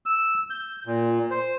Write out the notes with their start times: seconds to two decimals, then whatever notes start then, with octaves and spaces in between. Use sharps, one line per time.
0.06 E6
0.50 G6
0.86 A#2
1.30 C5